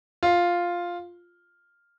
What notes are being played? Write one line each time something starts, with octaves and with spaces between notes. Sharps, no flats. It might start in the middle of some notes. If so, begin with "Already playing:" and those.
F4